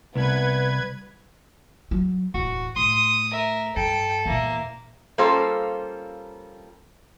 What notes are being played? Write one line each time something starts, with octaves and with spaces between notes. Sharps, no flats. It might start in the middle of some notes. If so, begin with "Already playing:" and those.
C2 B3 B4 G#6
F#3
D1 E2 F#4
A2 C6 D#6
A#4 E5
G2 A4 G5
E2 A#2 A#3 E5
G3 A#3 C#4 F4 A4 C5